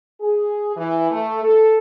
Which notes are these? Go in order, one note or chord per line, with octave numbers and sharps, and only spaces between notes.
G#4
E3
A3
A4